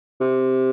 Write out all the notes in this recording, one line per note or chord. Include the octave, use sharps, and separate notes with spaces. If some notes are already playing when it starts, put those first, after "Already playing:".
C3